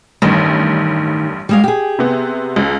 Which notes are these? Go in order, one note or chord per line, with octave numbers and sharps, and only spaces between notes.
A1 G2 D#3
G3 G#3 F5
G4 G#4
C3 B3
C#2